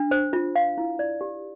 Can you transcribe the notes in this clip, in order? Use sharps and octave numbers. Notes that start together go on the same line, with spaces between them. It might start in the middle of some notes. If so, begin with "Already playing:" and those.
Already playing: D4
C5
F4
F5
E4
D5
G4